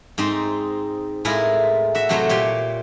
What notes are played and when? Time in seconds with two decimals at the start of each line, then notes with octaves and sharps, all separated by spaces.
0.18 G#2 C4 D#4 C6
1.25 A2 G#3 E4 F4 A#4
1.95 F#4 E5
2.09 C3 F#3 A3 C5 C#5 A#5
2.29 A#2 G4 C#5 C6